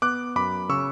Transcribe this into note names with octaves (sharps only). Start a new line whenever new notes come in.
B3 D6 F#6
F#2 B5 D6
C#3 C#6 E6